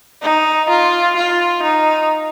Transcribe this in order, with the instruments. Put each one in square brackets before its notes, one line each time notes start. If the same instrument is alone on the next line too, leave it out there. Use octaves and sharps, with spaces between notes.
[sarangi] D#4
F4
F4
D#4